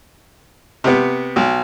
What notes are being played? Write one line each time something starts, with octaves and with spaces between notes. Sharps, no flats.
C3 B3
B1